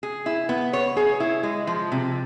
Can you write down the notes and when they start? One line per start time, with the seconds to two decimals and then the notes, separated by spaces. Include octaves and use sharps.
0.03 G#4
0.26 E4
0.49 B3
0.73 C#5
0.97 G#4
1.20 E4
1.43 G#3
1.67 F3
1.92 C3